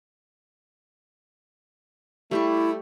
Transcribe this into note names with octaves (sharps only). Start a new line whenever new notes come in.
G3 A3 E4 G4 C#6